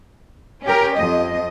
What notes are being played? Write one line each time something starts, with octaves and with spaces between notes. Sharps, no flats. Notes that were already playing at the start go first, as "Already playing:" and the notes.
C#4 G4 A#4
F2 D#5